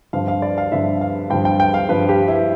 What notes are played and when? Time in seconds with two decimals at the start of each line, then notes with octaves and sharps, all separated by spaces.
0.13 G2 D3 F3 F5
0.28 F5
0.42 D5
0.58 F5
0.72 G2 D3 F3 E5
1.01 F5
1.30 G2 D3 F3 G5
1.45 G5
1.60 G5
1.74 F5
1.89 G2 D3 F3 B4
2.09 G4
2.28 E4